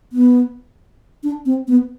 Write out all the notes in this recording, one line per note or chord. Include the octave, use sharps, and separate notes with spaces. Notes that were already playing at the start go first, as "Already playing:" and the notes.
B3
D4
C4
B3